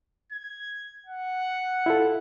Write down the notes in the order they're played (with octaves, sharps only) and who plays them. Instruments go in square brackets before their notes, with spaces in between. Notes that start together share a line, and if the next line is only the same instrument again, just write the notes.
[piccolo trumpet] G#6
F#5
[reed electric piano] E4 F4 A4